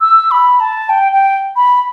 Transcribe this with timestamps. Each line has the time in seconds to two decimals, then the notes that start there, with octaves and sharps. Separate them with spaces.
0.01 E6
0.31 B5
0.60 A5
0.89 G5
1.12 G5
1.56 B5